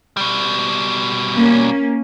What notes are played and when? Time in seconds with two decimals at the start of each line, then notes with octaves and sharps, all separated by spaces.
0.17 B2 G3
1.36 A#3 C#4